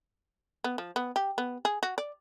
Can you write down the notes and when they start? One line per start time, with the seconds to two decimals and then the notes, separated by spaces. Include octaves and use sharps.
0.64 B3
0.78 F3
0.96 B3
1.16 G4
1.38 B3
1.65 G#4
1.83 F#4
1.98 D5